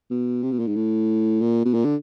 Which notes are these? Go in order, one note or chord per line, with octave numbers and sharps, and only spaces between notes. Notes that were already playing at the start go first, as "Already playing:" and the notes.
B2
C3
B2
A#2
G#2
A2
A#2
B2
A#2
D3